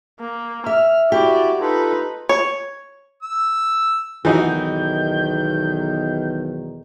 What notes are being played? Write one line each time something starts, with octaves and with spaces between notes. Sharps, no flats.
A#3
E5 F6
E4 F#4 G4 D5
D#4 F4 A4 B4
C#5
E6
B1 E2 D#3 E3 D#4 F#4 G6